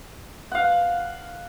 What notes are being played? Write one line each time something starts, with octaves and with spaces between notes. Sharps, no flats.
F5 F#5